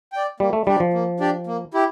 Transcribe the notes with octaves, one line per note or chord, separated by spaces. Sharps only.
D5 G5
G3 A#3
A3
G3 D4 G4 D5
F3
A#3
D4 G4 D5
A#3
E4 G4